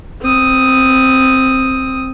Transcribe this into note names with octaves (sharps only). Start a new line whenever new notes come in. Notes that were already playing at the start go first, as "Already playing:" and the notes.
C4 D#6